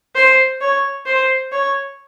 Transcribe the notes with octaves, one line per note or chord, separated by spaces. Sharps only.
C5
C#5
C5
C#5